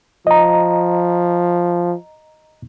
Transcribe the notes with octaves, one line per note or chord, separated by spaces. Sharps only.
F3 D#5 A#5